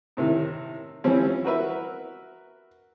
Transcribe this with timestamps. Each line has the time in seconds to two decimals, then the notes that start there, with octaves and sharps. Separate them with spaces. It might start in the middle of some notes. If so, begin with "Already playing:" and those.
0.17 A2 C3 D#3
1.04 E3 F3 G3 C4 C#4
1.44 F#4 A#4 B4 E5